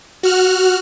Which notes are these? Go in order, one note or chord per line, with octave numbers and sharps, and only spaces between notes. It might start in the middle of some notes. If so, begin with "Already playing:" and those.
F#4 F6 F#6